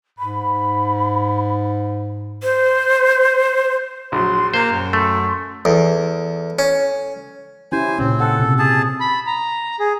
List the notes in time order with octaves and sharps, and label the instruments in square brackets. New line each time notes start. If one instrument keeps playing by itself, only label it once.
[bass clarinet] G#2 [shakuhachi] B5
[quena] C5
[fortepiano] A#1 F#3 [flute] C6
[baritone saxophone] A#3 [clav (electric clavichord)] C5 [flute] A#5
[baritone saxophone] F#2
[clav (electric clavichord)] A3 [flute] C6
[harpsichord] E2 [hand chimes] A4
[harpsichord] C#4
[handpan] C#4 E4 G4 [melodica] C5 G#5
[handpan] A#2 C#3 C#4 [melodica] C4
[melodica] A4 [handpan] F#5
[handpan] C3
[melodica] G#4 A5
[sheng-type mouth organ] B5
A#5
G#4